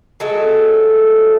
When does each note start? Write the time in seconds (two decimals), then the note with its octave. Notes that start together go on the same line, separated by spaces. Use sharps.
0.20 F#3 G#3 A3 A4